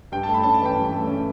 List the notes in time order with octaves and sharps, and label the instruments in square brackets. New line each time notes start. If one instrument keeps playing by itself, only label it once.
[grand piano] G2 [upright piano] G5
[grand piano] A3 [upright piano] A5
[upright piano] B5
[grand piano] C#4 [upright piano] A5
[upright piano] A5
[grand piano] E3
[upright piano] G5
[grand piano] G2
A3
C#4